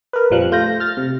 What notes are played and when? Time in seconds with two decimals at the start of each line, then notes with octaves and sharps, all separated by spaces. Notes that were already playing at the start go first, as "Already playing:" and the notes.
0.13 A#4 B4
0.30 F2 A#2 F3 G3 F#6
0.51 A3 F4 G6 A#6
0.80 F6 A6
0.97 C3